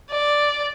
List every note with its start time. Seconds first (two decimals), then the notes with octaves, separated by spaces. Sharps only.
0.10 D5